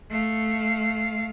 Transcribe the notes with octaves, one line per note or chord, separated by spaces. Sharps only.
A3 F5